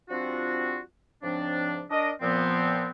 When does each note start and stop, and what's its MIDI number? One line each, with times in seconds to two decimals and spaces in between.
0.09 0.79 53
0.09 0.79 55
0.09 0.79 60
0.09 0.79 62
0.09 0.79 65
0.09 0.79 66
1.23 1.84 44
1.23 1.84 49
1.23 1.84 53
1.23 1.84 60
1.23 1.84 62
1.91 2.11 62
1.91 2.11 70
1.91 2.11 75
2.22 2.89 46
2.22 2.89 53
2.22 2.89 59
2.22 2.89 60